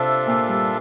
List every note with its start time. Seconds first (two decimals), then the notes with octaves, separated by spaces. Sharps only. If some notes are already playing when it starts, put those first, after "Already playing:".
Already playing: C3 D4 F4 A4 E5
0.27 A#2
0.48 G2